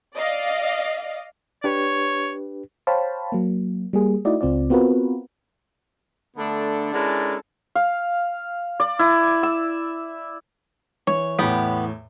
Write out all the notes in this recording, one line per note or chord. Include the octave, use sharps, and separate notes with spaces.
D5 D#5 F5
D4 G4 B4 C#5
C5 C#5 F5 G5 A5 B5
F#3 A#3
G3 A#3 G#4
A3 D#4 E4 F#4 D5 D#5
C#2 C4 F4 D5
B3 C4 F4 F#4 A#4 B4
D3 A3 B3 D4 A4
G#3 C#4 D4 E4 A4 A#4
F5
D5
E4
E6
E3 C#5
E2 A2 B3 G4